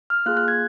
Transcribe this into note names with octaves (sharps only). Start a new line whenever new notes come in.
F6
A#3 F4 G#4 F#6
F#6
G#6